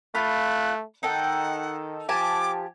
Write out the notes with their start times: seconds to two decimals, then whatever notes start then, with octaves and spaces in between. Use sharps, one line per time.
0.15 A3 F4 F5 B5 F#6
1.03 D#3 D#4 A4 F#5 G5
2.09 F3 G4 G#5 A5 D6